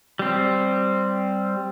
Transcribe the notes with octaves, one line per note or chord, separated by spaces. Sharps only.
G3 C4